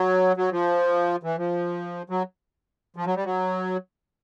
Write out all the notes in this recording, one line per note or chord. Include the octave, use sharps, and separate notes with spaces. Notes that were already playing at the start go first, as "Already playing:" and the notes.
Already playing: F#3
F#3
F3
E3
F3
F#3
F3
F#3
G3
F#3